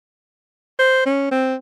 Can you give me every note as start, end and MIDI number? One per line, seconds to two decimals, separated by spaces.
0.79 1.05 72
1.06 1.29 61
1.31 1.55 60